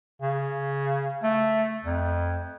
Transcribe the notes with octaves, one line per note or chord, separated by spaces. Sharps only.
C#3
A3
F2